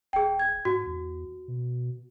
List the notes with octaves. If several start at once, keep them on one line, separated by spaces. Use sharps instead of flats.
D#1 G#4 G5
G#6
G#2 F#4
E2
B2